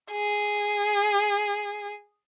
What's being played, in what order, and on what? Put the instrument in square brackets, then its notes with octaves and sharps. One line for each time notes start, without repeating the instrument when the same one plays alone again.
[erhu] G#4